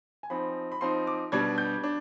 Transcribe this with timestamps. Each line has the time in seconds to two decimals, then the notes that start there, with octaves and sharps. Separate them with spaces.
0.23 G#5
0.30 F3 C4 D#4 B5
0.72 B5
0.81 F3 C4 D#4 C6
1.07 D6
1.32 B2 G3 D4 G#6
1.58 G6
1.83 D4